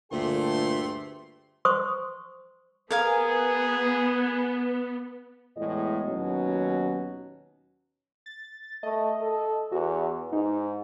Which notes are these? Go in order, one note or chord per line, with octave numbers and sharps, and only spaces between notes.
D2 G2 A#2 A3 G#4 A4 G5 C6
C5 C6 C#6 D#6
B3 G#4 A#4 F5 G#5
E2 A2 G#3 D#5
D#2 B2 F#3 C#4
A6
A3 D#5
A4
E2 F#4
G#2 D#4